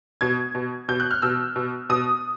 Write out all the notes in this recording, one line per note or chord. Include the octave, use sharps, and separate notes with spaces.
B2 G#6
B2
B2 G6
F#6
F6
B2 E6
B2
B2 D#6